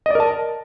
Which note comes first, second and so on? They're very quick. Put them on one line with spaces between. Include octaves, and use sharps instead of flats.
D#5 D5 A#4 A5